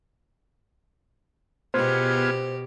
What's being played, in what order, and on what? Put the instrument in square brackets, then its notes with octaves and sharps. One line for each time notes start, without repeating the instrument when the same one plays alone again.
[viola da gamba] B2 G4 [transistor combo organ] B3 F4 G#4 [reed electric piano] C5